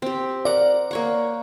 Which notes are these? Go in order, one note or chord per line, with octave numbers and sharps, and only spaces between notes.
C4 G4
A#4 D5 F#5
A#3 C#5 F#5